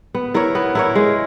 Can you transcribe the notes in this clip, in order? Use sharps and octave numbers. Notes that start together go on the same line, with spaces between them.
B3
E4 A#4 C#5
B3
E4 A#4 C#5
G#3